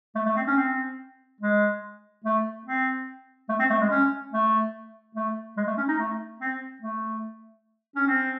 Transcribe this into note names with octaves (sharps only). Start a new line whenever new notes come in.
A3
A3
C4
C#4
C4
G#3
A3
C4
A3
C4
A3
G#3
C#4
A3
A3
G#3
A3
C#4
D#4
A3
C4
A3
C#4
C4